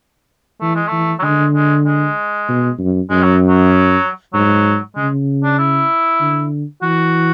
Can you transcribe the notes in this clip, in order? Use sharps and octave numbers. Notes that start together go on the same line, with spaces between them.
E3 A3
G#3
E3 A3
F#3
D3 G#3
G#3
G#3
B2
F#2
F#2 G#3
F#3
F#3
G#2 F#3
C#3 G#3
D4
E4
D3
E3 F#4